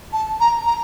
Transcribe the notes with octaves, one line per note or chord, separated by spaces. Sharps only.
A5
A#5
A#5